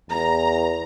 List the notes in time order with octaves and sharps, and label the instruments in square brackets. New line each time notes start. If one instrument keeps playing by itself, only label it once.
[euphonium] E2 [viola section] A#5